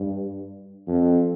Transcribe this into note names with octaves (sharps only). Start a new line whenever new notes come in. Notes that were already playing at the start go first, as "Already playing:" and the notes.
Already playing: G2
F2